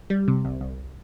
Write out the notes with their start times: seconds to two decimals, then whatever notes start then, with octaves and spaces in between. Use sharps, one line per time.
0.10 G3
0.28 C3
0.45 C2
0.61 C2